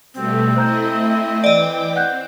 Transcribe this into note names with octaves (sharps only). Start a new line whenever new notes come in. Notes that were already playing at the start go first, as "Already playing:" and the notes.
B2 G3 A3 C4
A3 E4 C5 D#5 A#5 G6
E3 D5 D#5 G5 D6
C4 F#5 F#6 G6